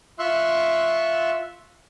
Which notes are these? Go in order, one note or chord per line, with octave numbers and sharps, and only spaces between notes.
F4 E5 C6 C#6 E6 F#6